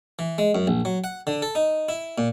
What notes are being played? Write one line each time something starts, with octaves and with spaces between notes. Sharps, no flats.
E3
G#3
F#2
A#1
F#3
F#5
D3
A4
D#4
E4
A#2